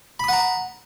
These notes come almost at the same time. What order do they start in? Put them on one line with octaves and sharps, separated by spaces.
B5 D#6 F#5 A#5